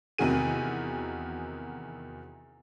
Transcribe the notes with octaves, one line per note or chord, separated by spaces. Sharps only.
E2 C3 D#3 F#4 G#4 D#7